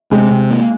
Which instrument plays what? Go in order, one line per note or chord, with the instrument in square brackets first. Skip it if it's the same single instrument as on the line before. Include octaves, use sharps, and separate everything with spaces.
[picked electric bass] C3 [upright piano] G#3
[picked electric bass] C3
A#3